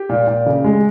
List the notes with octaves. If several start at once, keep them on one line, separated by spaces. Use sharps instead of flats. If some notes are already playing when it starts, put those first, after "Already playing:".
Already playing: G4
A#2
A#2
C#3
G#3